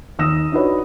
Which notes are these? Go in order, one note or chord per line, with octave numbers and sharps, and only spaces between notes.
D#2 D#4 D#6 E6 A#6 E7
D4 D#4 F#4 B4 C#5